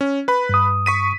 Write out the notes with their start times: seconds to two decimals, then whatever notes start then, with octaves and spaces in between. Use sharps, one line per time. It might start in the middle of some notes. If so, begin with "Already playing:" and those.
0.01 C#4
0.28 B4 B5
0.49 G2 D#6
0.86 C#6 B6 D#7